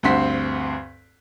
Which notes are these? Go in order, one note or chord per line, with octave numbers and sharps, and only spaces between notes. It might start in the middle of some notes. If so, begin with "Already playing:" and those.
D2 G2 C4 F#5 C6 B6